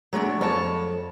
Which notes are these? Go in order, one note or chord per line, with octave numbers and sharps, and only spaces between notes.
F#3 G#3 A3 D4
F2 C#5 A5